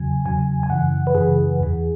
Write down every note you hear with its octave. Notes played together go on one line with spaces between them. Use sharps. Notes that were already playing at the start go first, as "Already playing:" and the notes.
Already playing: E2 C#3 F#3 G#5
E2 C#3 F#3 G#5
G#5
F#2 C#3 E3 F#5
B4
F#2 C#3 E3 G#4
E2 E3